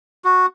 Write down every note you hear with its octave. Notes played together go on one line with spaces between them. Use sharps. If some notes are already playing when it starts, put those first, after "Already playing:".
F#4